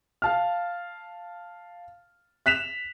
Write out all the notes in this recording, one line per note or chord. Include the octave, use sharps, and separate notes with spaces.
F5 A5 F6
F#6 B6 E7 F7